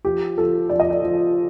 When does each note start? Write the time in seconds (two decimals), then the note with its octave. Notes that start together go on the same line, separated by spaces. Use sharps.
0.05 F3 G4
0.38 F3 A4
0.70 F3 D5
0.80 D#5
0.91 D5
1.03 F3